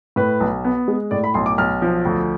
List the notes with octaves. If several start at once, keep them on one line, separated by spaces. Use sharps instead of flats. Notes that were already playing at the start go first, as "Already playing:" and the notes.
A2 B4
B1
B3
G#3
A2 D5
B5
B1 C6
D6
B1 F6
F3
D2